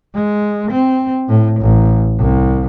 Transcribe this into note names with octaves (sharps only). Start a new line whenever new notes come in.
G#3
C4
A2
A1
C2